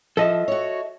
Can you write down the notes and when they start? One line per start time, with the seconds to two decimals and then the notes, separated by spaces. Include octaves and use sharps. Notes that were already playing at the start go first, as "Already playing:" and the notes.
0.17 F3 A4 D#5 E5
0.48 F#4 C#5